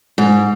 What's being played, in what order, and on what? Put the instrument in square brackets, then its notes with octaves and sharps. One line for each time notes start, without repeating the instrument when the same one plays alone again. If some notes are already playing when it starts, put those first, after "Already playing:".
[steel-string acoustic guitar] G#2